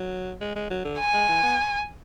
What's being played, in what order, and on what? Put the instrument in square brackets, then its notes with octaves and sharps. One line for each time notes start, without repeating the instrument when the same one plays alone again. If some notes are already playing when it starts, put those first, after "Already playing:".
Already playing: [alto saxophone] F#3
G#3
G#3
F#3
D3
[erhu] G#5
[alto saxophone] G#3
E3
B3